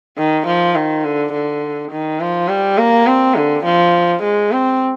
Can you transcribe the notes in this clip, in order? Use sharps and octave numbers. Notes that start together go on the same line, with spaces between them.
D#3
F3
D#3
D3
D3
D#3
F3
G3
A#3
C4
D3
F3
G#3
C4